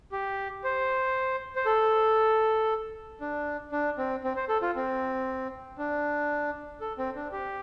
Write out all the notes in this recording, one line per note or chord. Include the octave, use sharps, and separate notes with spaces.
G4
C5
C5
A4
D4
D4
C4
C4
C5
A4
F4
C4
D4
A4
C4
D4
G4